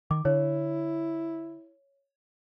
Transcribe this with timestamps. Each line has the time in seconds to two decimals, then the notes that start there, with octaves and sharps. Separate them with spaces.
0.11 D#3 D6
0.25 D3 E4 C#5